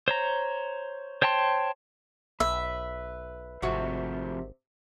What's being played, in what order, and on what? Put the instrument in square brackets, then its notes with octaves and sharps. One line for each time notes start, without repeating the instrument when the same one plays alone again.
[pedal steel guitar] C5 C#5 A#5
C5 C#5 G5 A5 C6
[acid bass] B1 [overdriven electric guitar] B4 [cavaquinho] E5
[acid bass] G#1 [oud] C3 F#4 [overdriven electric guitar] F3 A3